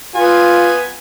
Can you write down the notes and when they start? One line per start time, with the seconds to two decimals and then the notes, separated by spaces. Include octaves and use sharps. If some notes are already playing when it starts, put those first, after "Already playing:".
0.15 B3 F4 G#5